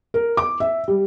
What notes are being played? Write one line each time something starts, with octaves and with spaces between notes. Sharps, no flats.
A#4
D6
E5
G3